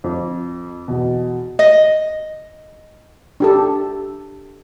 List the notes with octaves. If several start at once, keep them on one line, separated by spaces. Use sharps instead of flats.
F2
E2 B2
D#5
D4 G4 A4